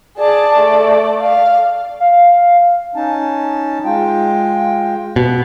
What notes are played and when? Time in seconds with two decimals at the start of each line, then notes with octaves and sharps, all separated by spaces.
0.17 G#4 D5 A5
0.57 A3
1.22 F5
2.00 F5
2.96 C#4 D#4 A5
3.85 G#3 F4 G5
5.16 B2